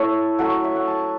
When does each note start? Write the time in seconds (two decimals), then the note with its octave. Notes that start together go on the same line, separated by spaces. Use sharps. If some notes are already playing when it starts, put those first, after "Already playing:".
Already playing: A3 C#4 E4 A4 C#5 E5
0.39 F#3 A3 C#4 F#5
0.64 E5
0.76 F#5
0.87 A5